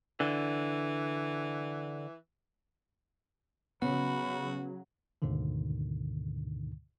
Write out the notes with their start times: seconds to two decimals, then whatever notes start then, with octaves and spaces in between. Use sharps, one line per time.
0.20 D3 E3
3.82 C#3 F#3 B3 C#4 F#4 B5
5.22 D2 G#2 B2 D3 D#3